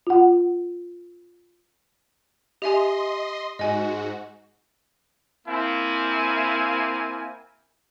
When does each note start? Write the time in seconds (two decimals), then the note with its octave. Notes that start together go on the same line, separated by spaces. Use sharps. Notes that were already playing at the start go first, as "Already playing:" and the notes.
0.07 F4 F#5
2.62 G4 D#5 E5 G#5 C6
3.59 G#2 F#4 D#5 G#5
5.47 A#3 C4 E4 F5 G#5